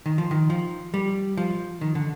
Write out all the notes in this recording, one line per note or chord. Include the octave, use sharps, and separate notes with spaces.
D#3
F3
D#3
F3
G3
F3
D#3
D3